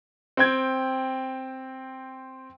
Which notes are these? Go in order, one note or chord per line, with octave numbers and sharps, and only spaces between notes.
C4 G5 G#6